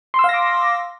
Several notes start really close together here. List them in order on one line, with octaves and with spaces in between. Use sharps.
C6 E6 F5 A#6 D6